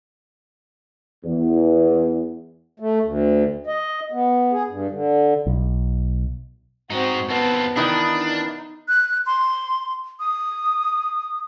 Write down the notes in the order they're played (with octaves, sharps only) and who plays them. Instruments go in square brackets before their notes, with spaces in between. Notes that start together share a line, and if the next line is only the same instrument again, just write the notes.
[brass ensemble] E2
[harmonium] A3
D2
D#5
B3
G#4
G2
D3
[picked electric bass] B1
[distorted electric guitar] G#2 D#4 [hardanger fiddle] C4 F#4
[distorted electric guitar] D#2 C4 [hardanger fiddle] B3 A5
[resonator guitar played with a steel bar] D#3 E3 B3 [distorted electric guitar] D4 [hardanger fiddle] D#4
[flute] F#6
C6
D#6